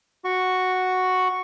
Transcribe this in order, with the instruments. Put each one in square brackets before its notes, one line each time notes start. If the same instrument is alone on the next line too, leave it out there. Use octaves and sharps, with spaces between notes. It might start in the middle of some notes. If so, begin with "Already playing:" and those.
[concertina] F#4 C#6